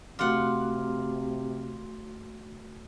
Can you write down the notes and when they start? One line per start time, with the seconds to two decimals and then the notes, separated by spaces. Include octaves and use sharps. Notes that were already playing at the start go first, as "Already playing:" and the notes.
0.19 C3 A3 F4 F#4 F#5 D6